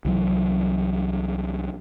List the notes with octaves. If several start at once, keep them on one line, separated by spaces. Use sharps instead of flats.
C2 E3 F#3